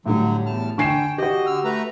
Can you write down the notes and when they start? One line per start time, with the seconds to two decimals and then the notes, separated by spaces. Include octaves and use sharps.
0.06 A2 D3 F#3 G3
0.46 E2 A5 F6
0.78 D3 G5 G#5 C#6 C7 E7
1.18 F#4 G4 D#5
1.47 D3 E6 F6
1.64 A3 B4 A#5